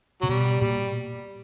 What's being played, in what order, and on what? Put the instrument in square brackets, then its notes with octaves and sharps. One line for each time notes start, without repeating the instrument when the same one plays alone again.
[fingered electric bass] C3 [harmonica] F#3
[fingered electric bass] B2 [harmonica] G3
[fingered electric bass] A#2 [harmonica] G3